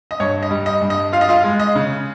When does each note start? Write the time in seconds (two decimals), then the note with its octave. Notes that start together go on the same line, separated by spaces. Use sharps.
0.11 D#5
0.20 G2 C#5
0.43 D#5
0.51 G3
0.66 D#5
0.81 G2
0.90 D#5
1.13 F4 F5
1.21 D#5
1.29 F4 F5
1.44 G#3
1.59 D#5
1.75 C#3